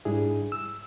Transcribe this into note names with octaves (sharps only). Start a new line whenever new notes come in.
G#2 G3 D4 E4 G#4
E6